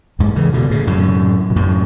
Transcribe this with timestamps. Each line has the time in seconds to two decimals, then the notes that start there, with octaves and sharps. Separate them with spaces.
0.19 E2 G#2
0.36 C#3 E3
0.53 B2 D3
0.70 A2 C#3
0.87 F#2 A2
1.50 B2
1.56 F#2 A2